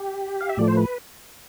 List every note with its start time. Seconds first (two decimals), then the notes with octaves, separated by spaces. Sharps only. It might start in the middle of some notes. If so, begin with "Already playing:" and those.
Already playing: G4
0.41 F5
0.49 E5
0.57 A2 F3 A3 D5
0.68 C5
0.77 B4